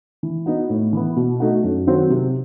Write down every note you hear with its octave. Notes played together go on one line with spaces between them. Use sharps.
E3
B3 D#4 F#4
A2
E3 B3
B2
A3 D#4 F#4
F#2
D#3 F#3 C4 F#4
C3